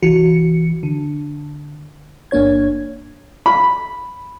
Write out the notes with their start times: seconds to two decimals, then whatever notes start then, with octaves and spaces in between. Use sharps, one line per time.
0.02 C2 E3 F#4 C#7
0.83 D3
2.31 G1 A#3 D4 C#5 G#6
3.46 B5